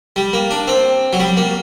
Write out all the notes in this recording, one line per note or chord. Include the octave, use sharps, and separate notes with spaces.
G3
A#3
D4
C4
F#3
G3
A#3